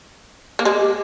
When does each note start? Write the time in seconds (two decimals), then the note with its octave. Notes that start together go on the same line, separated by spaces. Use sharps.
0.59 A#3
0.65 G#3 G4
0.80 G4